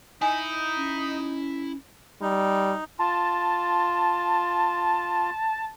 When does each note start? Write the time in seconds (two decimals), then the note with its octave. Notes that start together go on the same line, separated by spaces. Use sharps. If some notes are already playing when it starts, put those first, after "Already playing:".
0.22 D#4 E4 G#5
0.76 C#4
2.21 G3 D#4
2.99 F4 A5